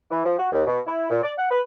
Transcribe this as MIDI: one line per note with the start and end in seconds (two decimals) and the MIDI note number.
0.11 0.24 52
0.25 0.35 53
0.38 0.48 66
0.52 0.63 39
0.66 0.80 47
0.87 1.08 64
1.10 1.21 46
1.23 1.32 74
1.37 1.46 78
1.50 1.60 71